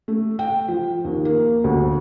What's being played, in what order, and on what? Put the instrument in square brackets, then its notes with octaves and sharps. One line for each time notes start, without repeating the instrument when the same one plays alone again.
[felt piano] A3
G5
F3
D#2
A#3
D2